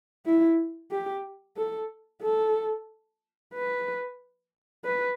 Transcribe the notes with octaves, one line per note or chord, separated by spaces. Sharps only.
E4
G4
A4
A4
B4
B4